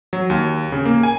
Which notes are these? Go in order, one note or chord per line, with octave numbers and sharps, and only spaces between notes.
F#3
D#2
C#3
A#3
G#5